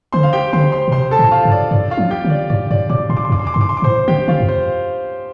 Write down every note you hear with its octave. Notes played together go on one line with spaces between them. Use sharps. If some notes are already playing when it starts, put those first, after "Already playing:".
D3 C5 C6
F5
G4 G5
D3 C5 C6
C5 C6
A2
C3 C5 C6
A4 A5
A2
F4 F5
G2
D5
G2 D5
F4 F5
F3
G4 G5
D3
D5
G2 D5
G2 D5
A2 D5 D6
A2 C6
D6
C6
F2 D6
C6
D6
G2 C6
D6
C6
D6
A2 C5 C6
D3 G4 G5
D3 F4 F5
F2
C5